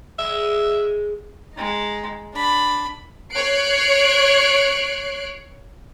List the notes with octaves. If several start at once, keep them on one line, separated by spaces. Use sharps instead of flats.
G#3 E5
G#3 D#4
D4 B5
C#5 F#6 C7 D7